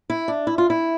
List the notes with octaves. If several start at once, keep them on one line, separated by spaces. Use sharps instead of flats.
E4
D4
E4
F4
E4